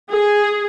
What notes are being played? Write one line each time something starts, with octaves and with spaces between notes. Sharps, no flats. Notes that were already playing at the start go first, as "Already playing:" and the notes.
G#4